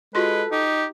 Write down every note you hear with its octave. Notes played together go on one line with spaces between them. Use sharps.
G#3 F4 F#4 A4 B4 C6
D#4 G4